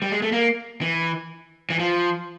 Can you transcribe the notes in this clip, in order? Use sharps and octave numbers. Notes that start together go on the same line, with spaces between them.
G3
G#3
A3
A#3
E3
E3
F3